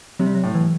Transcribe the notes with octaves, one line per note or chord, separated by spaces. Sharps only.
C3 F#3
G3
F#3
A2
E3